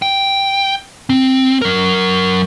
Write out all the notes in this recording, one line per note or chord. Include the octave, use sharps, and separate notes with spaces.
G5
C4
F#3 A#4